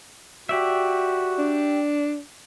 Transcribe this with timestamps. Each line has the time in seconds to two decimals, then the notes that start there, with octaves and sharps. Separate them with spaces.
0.49 F#4 G4 D5 E5
1.38 D4